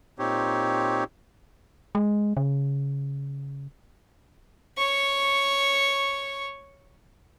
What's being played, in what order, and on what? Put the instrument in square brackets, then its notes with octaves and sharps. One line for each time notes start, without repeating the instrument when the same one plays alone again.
[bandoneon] A#2 C4 D#4 G4 C#5
[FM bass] G#3
C#3
[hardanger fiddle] C#5 C#6